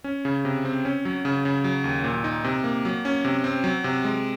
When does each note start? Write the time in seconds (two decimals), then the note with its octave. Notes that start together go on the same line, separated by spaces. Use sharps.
0.04 C#4
0.25 C#3
0.45 C3
0.65 C4
0.85 C#4
1.05 F#3
1.25 C#3
1.45 C#3
1.64 F#3
1.84 D#2
2.04 A#2
2.24 D#4
2.44 C3
2.64 A#3
2.85 F#3
3.05 C#4
3.25 C3
3.44 C4
3.64 F#3
3.84 C3
4.05 G#3